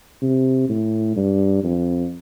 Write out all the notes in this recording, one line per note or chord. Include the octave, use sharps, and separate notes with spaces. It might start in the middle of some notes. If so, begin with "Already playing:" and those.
C3
A2
G2
F2